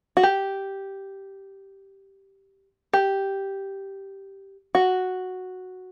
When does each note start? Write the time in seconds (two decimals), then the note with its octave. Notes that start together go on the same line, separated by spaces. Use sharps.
0.17 F#4
0.23 G4
2.93 G4
4.75 F#4